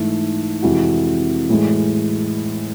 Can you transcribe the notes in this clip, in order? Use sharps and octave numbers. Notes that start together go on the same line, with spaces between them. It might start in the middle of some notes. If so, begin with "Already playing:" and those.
Already playing: G#2 E3 A3
F2 C3 E3 G#3 F#4
A2 E3 G#3